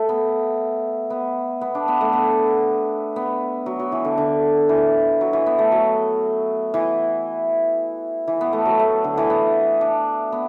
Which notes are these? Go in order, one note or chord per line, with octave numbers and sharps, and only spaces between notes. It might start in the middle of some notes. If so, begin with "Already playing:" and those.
Already playing: A3
B3
B3
B3
D4
B3
A3
B3
B3
F#3
F#3
E3
D3
D3
E3
F#3
E3
B3
A3
F#3
E3
E3
B3
A3
F#3
A3
D3
E3
B3
D4
B3